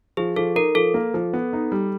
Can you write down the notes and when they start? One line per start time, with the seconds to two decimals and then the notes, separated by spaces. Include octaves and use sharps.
0.17 F3 G#4
0.36 F3 A4
0.56 D#4 A#4
0.75 F3 A4
0.94 A#3
1.14 F3
1.33 B3
1.53 D#4
1.72 G3